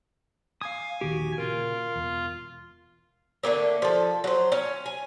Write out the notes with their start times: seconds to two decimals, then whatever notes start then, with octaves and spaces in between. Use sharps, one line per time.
0.61 F5 G#5 D#6
1.01 A#1 D#2 D#3 F#4 G4
1.38 A#2 C#3 F4 A#4
1.95 E1 E2
3.43 D3 A3 A#3 C4
3.82 F3 A4
4.24 F#3 C5
4.52 C#4
4.86 G#5